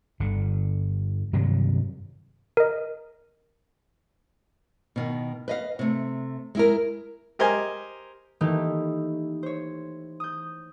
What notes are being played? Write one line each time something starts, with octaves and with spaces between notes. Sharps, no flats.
G1 D3
G2 C3 D#3 F#3
A#4 D#5
B2 D#3
B4 D#5 F5
C3 A3
G#3 E4 A#4
G4 A#4 C5 D#5 G#5
D#3 E3 A3 A#3 D#4 G4
C5 C#5
D#6 G6